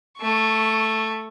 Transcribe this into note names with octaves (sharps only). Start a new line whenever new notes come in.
A3 C#6